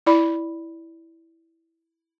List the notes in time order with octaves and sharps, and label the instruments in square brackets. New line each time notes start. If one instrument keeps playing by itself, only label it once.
[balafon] E4 D5 B5